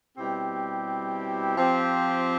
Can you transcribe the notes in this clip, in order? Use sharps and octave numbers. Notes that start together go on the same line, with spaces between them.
B2 G3 C4 E4 G4
F3 C4 G4